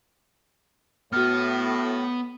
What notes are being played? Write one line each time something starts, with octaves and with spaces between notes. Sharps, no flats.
A2 B3 F#4 F6